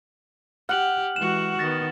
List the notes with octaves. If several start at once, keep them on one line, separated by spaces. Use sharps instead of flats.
G4 F#5 F6 F#7
E3 G#3 F#4 E7
D#3 B3 A6 A#6